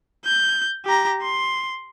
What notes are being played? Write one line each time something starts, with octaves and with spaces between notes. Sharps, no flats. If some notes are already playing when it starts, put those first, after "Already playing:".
G6
G4 A#5
C6